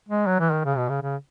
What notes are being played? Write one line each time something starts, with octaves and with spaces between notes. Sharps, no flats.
G#3
F#3
E3
D#3
C#3
B2
C#3
C#3